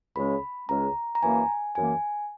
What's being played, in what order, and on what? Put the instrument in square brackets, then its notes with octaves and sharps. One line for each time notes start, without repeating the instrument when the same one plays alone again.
[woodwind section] C#2 C#3 G#3 C#4 [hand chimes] B5
[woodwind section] C#2 C#3 G#3 C#4 [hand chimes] A#5
[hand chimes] A#5
[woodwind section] F#2 E3 A#3 [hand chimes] G#5
[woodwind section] F#2 E3 A#3 [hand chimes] G#5